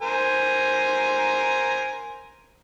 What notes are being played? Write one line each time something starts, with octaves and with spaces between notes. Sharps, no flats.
A#4 C5 G#5